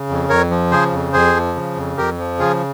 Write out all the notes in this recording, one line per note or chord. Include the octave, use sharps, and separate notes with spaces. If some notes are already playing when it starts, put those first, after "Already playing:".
Already playing: C#3
F2
F2 A#4 C#5
F3
C#3 G#4 C5
F2
F2 G#4 C5
F3
C#3
F2
F2 G4 A#4
F3
C#3 F4 G#4